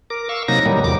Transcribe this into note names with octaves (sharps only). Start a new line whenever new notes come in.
A#4 D6
F5 C#6 E6
C3 F#3 A#3 D#4 A#6
A2 D#3 F#3 G3 A#3
E2 C3 D6